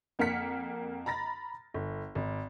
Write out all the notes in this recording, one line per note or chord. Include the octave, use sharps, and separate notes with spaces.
F2 A#3 F#5 F6 B6 C#7
A#5 B5 A6 A#6
G1
G#1